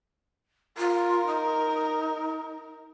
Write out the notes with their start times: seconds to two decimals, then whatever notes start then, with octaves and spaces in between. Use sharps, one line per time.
0.78 F4 A#4
1.27 D#4